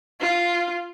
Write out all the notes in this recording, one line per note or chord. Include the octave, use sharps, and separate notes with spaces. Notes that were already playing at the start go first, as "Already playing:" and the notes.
F4